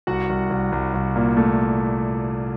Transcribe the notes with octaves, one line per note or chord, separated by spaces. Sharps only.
C2 F#4 F#5
C2
C2
C2
C2
A#2
A3